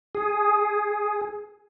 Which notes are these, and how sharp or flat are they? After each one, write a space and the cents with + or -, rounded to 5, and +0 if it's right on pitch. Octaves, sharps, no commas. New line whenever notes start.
G#4 +5